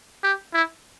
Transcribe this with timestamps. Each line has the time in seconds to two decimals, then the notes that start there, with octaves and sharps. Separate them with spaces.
0.23 G4
0.53 E4